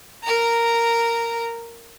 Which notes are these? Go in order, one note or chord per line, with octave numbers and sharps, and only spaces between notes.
A#4 A#5